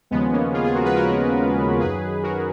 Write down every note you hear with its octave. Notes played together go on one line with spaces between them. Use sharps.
D#2 C#3 F3 G#3 B3
A#3 C#4
F4 G#4
F4 G#4
F#4 A#4
G#4 B4
F#4 A#4
F#2 D#3 F#3 G#4 B4
F#4 A#4